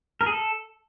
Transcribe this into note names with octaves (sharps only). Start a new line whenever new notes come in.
A#4
G#4
A4